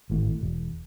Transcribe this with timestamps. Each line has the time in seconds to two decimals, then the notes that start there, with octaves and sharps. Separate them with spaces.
0.10 G#1 A2
0.41 E1